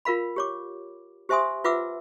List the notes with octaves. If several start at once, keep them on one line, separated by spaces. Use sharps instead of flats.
F4 A#4 F5 B5
G4 C#5 D6
G4 C5 E5 G#5 C6 D#6
F4 B4 E5 F#5 D6 E6